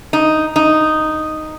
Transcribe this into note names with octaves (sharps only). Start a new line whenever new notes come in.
D#4
D#4